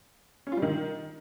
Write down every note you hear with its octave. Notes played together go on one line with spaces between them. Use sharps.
C#4
F4
G3
D#3